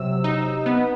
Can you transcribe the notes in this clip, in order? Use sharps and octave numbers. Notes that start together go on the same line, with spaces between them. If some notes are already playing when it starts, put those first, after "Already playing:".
Already playing: C3 F#3 E6
D#4
B3